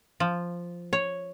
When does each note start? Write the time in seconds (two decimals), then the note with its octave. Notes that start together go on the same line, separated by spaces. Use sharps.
0.20 F3
0.93 C#5